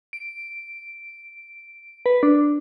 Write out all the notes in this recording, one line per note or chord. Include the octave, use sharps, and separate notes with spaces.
D7
B4
D4